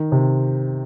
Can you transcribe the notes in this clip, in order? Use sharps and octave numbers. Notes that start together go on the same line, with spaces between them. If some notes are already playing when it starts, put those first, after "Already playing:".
Already playing: D#3
C3